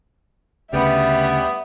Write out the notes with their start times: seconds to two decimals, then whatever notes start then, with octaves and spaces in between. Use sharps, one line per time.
0.73 D2 C#3 G3 B3 E5